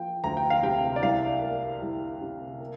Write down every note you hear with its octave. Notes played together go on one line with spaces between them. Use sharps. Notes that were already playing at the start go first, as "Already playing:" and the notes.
Already playing: F3 A#3 G5
D2 A#5
G5
F5
C3 G5
D5
C2 F5
A#3
C2
C3
A#3